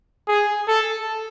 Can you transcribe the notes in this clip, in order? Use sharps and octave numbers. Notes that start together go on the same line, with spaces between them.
G#4
A4